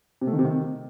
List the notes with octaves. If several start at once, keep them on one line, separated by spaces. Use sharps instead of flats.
C3
A3
D#3
C3
D#3